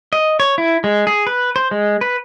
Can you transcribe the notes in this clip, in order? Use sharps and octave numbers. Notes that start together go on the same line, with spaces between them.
D#5
C#5
E4
G#3
G#4
B4
C5
G#3
B4